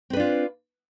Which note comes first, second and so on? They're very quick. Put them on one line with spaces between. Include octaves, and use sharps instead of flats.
C4 B4 D4 F4